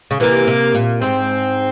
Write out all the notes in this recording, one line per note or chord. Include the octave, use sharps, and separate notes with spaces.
C#3
C3 E3 A#3
C3
A#2
G#2 C4